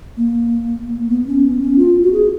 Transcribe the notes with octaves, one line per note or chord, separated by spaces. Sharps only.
A#3
B3
C#4
B3
C#4
F4
F#4
G#4